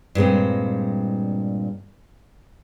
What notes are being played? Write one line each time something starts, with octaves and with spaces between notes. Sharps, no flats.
G2 A#2 G#3 C4